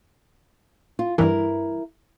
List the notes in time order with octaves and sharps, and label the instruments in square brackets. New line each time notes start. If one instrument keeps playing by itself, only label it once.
[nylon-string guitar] F4
[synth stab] G2 E3 [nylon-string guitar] E4 A#4